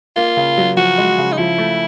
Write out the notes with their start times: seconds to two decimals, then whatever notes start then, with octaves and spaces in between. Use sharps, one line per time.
0.16 A#3 F4
0.37 C#3
0.57 F#3
0.77 F3 F#4
0.98 G#3
1.18 C#3
1.33 D#4
1.38 F3 E4
1.58 A3